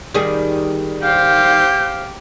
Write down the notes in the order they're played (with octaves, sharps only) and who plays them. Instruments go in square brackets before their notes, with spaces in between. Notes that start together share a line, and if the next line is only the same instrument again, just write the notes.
[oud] D#3 G3 G#4
[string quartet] G4 [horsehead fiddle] C5 F5 [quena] G6